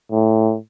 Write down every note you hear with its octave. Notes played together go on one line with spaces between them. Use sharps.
A2